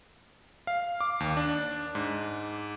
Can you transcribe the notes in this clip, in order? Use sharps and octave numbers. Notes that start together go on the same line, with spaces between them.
F5
D6
D#2
D4
G#2